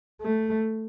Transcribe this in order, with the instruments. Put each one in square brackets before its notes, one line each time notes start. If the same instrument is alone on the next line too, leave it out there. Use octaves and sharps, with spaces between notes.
[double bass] A3